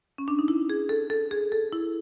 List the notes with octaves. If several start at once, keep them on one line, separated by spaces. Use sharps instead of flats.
C#4
D4
D#4
E4
G#4
A4
A4
G#4
A4
E4